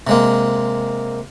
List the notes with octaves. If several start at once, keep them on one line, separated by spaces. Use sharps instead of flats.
C3 G#3 A#3